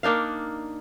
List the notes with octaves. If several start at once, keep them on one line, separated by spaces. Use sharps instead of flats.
A#3 D4 D#4 F5